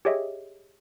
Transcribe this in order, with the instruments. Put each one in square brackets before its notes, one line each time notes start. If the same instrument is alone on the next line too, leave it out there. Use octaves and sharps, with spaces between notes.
[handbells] G4 G#4 C#5 D#5 E5